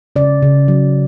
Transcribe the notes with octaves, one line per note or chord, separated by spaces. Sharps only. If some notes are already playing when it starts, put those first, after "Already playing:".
C#3 D5
C#3
F#3